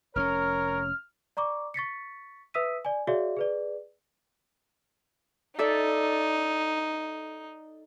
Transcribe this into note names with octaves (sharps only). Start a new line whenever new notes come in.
F1 C4 C#4 A#4 C#5 F6
D5 A#5 C#6 D6
C#6 A6 B6 C#7
B4 E5 D#6 E6 B6 D#7
D5 G#5
F#4 G#4 C#5 D5 E5 F5
G#4 B4 D5
D#4 A4 D5 E5